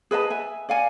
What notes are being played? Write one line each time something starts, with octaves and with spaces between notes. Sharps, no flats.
G#4 B4 D#5 A5
E5 G#5
D5 F5 F#5 G#5